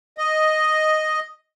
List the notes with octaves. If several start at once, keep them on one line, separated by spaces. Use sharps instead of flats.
D#5